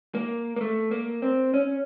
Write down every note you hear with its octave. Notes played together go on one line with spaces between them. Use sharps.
A#3
A#3
A3
A#3
C4
C#4